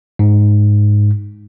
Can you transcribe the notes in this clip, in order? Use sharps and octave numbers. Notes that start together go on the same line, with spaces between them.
G#2